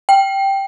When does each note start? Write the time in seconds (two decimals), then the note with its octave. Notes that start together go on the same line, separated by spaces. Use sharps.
0.09 G5